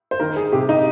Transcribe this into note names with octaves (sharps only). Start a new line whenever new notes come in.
C5
D#3 A#4
G#4
C3 G4
D#4